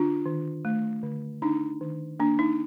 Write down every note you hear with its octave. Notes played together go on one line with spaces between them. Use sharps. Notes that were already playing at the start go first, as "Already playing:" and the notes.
Already playing: D3 D4 F4
D#3
A3
D3
D4 D#4
D#3
A#3 D4
D#4